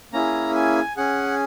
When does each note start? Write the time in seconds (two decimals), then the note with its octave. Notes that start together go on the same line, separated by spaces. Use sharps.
0.13 A#3 C#4 E4 G#4 A#5
0.55 G#5
0.97 C#4 G#4 F#5